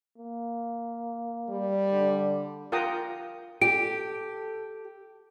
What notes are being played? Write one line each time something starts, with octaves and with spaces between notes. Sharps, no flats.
A#3
G3
D3
F4 A#4 F#5 G5 A#5 D#6
G4 A4 D7